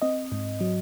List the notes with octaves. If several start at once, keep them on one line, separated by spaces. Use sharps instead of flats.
C4 D#5
G#2
F#3